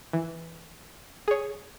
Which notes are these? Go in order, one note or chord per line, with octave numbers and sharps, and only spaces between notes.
E3
G#4 C#5